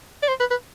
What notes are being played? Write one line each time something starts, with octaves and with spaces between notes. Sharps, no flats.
D5
C5
B4
B4